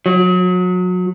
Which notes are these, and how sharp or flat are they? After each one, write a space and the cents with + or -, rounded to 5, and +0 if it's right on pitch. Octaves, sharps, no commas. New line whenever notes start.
F#3 -30